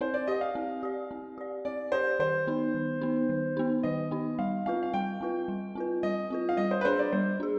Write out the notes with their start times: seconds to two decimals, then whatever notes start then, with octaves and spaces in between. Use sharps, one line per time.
0.01 C4 C5
0.14 D5
0.27 G4 D5 D#5
0.41 F5
0.55 C4
0.83 G4 D5
1.11 C4
1.38 G4 D5
1.65 C4 D5
1.92 G4 C5 D5
2.19 D#3 C5
2.47 B3 D#4
2.75 D#3
3.01 B3 D#4
3.29 D#3
3.57 B3 D#4
3.83 D#3 D#5
4.11 B3 D#4
4.39 G3 F5
4.66 C4 F4 B4 F5
4.83 F5
4.93 G3 G5
5.21 C4 F4 B4
5.48 G3
5.75 C4 F4 B4
6.03 G3 D#5
6.30 C4 F4 B4
6.49 F5
6.57 G3 D#5
6.71 C5
6.81 B4
6.85 D4 G#4 C5
6.99 D5
7.12 G3 C5
7.40 D4 G#4